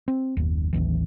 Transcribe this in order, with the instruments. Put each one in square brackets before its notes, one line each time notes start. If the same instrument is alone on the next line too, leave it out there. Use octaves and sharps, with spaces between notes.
[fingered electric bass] C4
F#1 D#2
A1 D#2 E3